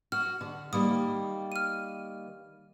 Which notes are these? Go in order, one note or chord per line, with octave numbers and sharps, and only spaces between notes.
F#4 F6
D3
D#3 G3 A#3 D#6
F6 D#7